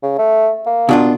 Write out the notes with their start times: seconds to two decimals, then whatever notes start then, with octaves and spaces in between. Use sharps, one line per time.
0.03 C#3
0.18 A3
0.66 A#3
0.89 B2 D4 F4